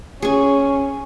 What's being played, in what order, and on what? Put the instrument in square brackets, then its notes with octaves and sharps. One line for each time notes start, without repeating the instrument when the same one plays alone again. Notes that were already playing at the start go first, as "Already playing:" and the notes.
[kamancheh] C#4 [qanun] G#4 G#5